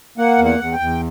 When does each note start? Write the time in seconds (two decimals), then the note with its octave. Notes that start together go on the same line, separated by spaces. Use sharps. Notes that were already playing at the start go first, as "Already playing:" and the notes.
0.18 A#3 F#5
0.38 E2
0.45 F#5
0.60 E2
0.72 G5
0.79 E2